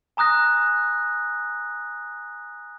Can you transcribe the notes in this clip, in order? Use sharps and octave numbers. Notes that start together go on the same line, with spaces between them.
G#5 A#5 D#6 F#6 A#6